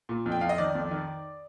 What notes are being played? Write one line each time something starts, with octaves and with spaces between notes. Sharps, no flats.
A#2
F2
G5
F2 F5
D#5
D#3 D5
F2
D#3